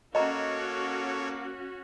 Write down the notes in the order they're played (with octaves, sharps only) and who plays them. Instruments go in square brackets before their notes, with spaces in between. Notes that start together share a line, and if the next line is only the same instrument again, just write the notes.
[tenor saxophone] A#3 [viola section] C#4 F#4 [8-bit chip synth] A4 C#5 [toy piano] D#5 A#5